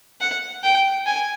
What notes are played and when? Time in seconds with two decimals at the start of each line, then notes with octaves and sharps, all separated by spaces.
0.21 F#5
0.64 G5
1.06 G#5